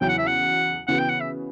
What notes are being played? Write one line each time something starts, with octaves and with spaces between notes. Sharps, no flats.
E2 C#3 F#3 C#4 E4 G5
F#5
E5
F#5
C#3 E3 B3 F#4 F#5
G5
F#5
E5